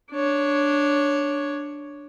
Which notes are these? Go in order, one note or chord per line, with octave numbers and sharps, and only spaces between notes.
D4 C#5